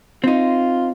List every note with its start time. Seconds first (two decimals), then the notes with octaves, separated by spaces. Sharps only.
0.24 C4 D#4 F4